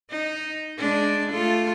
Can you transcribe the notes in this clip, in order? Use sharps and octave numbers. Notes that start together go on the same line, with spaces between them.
D#4
G#3 D4
A3 F4 A4